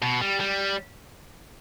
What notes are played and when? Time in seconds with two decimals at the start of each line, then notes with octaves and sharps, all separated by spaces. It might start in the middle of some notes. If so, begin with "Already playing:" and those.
0.02 B2
0.21 G3
0.40 G3